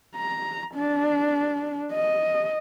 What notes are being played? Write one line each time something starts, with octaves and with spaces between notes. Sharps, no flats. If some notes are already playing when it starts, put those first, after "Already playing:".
A#5
D4
D#5